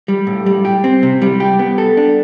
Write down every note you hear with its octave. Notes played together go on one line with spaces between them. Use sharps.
G3
A2
G3
G4
C4
C3
G3
G4
B3
A4
D4